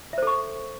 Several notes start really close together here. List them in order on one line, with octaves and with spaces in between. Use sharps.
E5 C5 A4 C#6